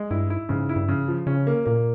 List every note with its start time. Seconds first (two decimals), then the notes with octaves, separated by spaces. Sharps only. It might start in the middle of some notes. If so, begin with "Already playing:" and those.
Already playing: G#3
0.11 G2 E4
0.30 E4
0.49 G#2 C#3
0.69 E4
0.76 G2
0.88 C#3
1.08 F3
1.27 C#3 C#4
1.47 A#3
1.65 A#2 A#3